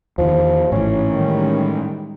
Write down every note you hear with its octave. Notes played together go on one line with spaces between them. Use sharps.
E2 D#3 F3
G#1 A2 E3 C#4
D#3 G3 G#3